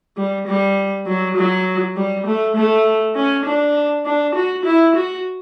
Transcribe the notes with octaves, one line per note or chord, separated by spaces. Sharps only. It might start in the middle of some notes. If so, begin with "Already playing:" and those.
G3
G3
F#3
F#3
G3
A3
A3
C#4
D4
D4
F#4
E4
F#4